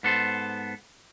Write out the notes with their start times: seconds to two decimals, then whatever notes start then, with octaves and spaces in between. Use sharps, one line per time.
0.03 G#2 B3 A4 C5